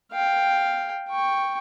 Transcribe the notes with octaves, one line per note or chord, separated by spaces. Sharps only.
F5 G5
G5 C#6